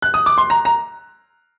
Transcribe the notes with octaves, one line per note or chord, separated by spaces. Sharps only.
F#6
D#6
D6
C6
A#5
A#5